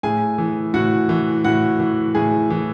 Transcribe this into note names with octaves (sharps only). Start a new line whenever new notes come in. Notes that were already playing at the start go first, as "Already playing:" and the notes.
A2 G#4 G#5
E3
A2 F#4 F#5
E3
A2 F#4 F#5
E3
A2 G#4 G#5
E3